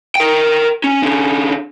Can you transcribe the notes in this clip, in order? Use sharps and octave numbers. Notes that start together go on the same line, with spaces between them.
A#4 G5
C#4
D3 C#4